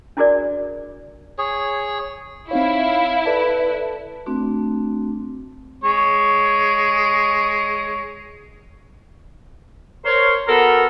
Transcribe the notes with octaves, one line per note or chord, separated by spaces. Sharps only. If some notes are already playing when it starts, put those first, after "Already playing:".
D4 E4 F#4 G#4 A#4 D5
G#4 C#5
C4 D#4 E4 C#5 F5
A4 B4 D5 A5
A3 C4 D4 F#4
G#3 C#5
A#4 C5 C#5
B3 F#4 A4 A#4